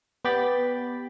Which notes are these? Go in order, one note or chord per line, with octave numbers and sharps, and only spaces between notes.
B3 G4 D5 G5 B5 A6